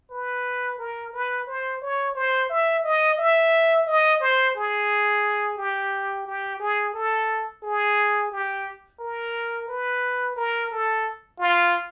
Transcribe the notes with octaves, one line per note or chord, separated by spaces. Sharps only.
B4
A#4
B4
C5
C#5
C5
E5
D#5
E5
D#5
C5
G#4
G4
G4
G#4
A4
G#4
G4
A#4
B4
A#4
A4
F4